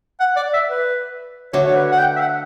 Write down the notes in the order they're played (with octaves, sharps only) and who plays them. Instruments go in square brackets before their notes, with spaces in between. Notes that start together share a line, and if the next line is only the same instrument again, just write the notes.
[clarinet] F#5
D5
E5
B4
[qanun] D3 A3 D4 F#4 [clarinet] C#5
[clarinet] C#5
B4
F#5
G5
E5
F#5